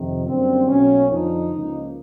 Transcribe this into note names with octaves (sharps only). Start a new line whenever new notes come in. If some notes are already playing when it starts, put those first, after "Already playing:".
Already playing: F2 C3 D#3
F#2 D3 G3 A#3 C4
B1 B2 F#3 A#3 C#4
F2 D3 F3 D#4
C#2 C#3 F3 A#3